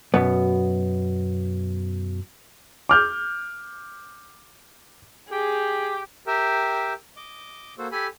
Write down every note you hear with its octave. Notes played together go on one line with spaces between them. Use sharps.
F#2 B2 B3
D6 F6 G6
G4 G#4
G4 A#4 E5 G5
D#5 D6
A#3 F#4 A4 C5
G4 A4 G#5 B5